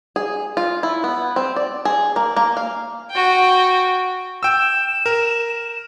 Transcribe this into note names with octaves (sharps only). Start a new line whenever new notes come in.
G#4
F4
E4
B3
C4
D5
G#4
A#3
A#3
F5
F#4 G5
G5 E6 E7
A#4